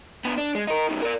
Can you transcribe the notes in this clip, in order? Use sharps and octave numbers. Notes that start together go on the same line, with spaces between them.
B3 D4
D4
G#3
D#4 A#4
F#2 D#3
A#4 D5